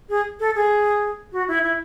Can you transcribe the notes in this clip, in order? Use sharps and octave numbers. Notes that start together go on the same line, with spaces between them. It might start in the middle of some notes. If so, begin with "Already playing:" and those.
G#4
A4
G#4
F#4
E4
E4